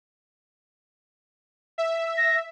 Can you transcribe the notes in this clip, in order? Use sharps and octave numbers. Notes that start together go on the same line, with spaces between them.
E5
A#6